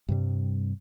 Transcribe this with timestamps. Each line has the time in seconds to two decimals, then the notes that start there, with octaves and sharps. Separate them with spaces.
0.09 G2 C3 G3